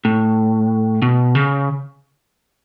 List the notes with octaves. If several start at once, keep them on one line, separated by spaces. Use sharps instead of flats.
A2
B2
C#3